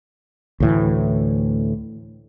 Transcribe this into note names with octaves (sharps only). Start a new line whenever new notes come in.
D2 A2 E3